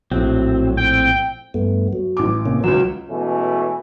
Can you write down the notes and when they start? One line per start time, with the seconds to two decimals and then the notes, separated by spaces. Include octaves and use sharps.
0.11 A#1 A2 F#3 C4
0.77 C4 G5
1.54 G2 A3 B3
1.93 F#3
2.17 A1 D6
2.46 C3 A#3 C#4
2.64 C#2 F#3 E6
3.09 B2 E3 G#3 A3 C#4